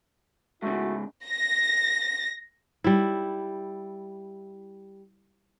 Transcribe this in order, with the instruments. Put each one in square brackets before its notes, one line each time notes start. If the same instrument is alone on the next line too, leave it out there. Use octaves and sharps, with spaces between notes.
[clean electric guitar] G#2 C#3 [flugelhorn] A3 [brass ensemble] E4 F#4
[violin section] A#6
[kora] G3 E4